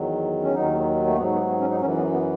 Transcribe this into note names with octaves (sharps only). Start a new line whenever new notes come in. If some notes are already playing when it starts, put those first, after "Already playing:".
Already playing: E2 D#3 F#3
C#4
D#2 D#3 F#3 D#4
A3
G#2 F#3 B3
B3
B3
C#4
D#4
F#2 E3 C#4
B3
B3